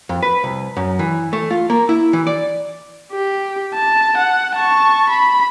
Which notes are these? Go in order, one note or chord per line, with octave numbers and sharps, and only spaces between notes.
F2
B4
C2
F#2
E3
A3
F4
A#3
E4
E3
D5
G4
A5
F#5
A5 C#6
B5